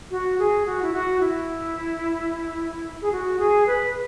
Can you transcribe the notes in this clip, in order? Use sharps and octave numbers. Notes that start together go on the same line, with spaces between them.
F#4
G#4
F#4
E4
F#4
E4
G#4
F#4
G#4
B4